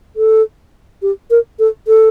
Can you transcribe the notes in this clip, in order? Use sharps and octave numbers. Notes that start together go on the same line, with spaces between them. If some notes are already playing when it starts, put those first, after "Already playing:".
A4
G4
A#4
A4
A4